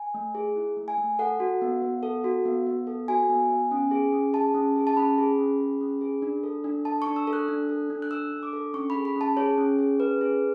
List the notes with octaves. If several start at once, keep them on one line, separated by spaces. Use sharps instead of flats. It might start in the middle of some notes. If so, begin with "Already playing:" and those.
Already playing: G#5
A3
G#4
E4
A3
G#5
A3
A4 F#5
F#4
B3
B3
A4
F#4
B3
B3
A4
F#4 G#5
B3
B3
C#4
G#4
C#4
G#4 A5
C#4
G#4
A5
C#4 B5
G#4
C#4
G#4
C#4
G#4
D4
A4
D4
A4 A5
D4 C#6
E6
A4
F#6
D4
A4
D4
F#6
A4 E6
D4
D6
A4
C#4 C#6
B5
G#4
B5
C#4 A5
G#4 C#5
C#4
G#4
C#4 B4
G#4